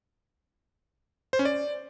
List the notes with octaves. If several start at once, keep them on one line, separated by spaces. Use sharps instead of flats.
C5
C#4
D5